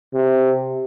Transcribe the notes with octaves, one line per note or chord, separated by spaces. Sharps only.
C3